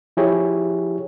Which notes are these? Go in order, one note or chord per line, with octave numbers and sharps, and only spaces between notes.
F3 E4 G4 G#4 C#5